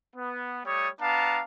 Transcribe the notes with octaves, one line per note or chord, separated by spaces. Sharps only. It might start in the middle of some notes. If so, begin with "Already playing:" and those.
B3
G3 A3 C#5 C#6 D#6
B3 D4 F5 A5 A#5